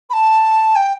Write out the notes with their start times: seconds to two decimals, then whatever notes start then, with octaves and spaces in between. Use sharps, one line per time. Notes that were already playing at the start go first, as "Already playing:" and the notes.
0.09 B5
0.13 A5
0.75 G5